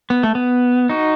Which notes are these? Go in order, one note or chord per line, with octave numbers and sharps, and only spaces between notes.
B3
A3
B3
D#4 F#4